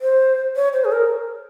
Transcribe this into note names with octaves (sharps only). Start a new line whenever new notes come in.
C5
C#5
C5
G#4
A#4